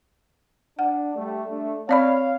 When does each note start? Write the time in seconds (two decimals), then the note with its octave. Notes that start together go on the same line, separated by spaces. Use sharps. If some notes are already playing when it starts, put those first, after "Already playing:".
0.79 D4 F#5
1.16 G3 A3
1.49 A3 D4
1.89 C4 C#5 D5 F5 B5